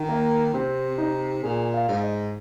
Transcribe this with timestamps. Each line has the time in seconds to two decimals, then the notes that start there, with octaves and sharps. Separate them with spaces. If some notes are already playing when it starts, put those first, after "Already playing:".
Already playing: D#3
0.09 A#3
0.54 C3 C4
0.98 D#4
1.43 A#2 G#4
1.74 F5
1.88 G#2
2.03 D#5